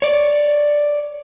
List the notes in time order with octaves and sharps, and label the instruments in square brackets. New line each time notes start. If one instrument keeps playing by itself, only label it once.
[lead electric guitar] C#5 D5